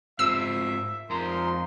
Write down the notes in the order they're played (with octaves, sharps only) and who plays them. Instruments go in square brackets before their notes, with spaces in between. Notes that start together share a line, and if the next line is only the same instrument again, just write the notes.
[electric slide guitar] G#2 C4 F4 [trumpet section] E5 [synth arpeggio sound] E6
[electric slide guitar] F2 A#5 [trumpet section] G#3 D#4 C6 [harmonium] F4 A#4 C5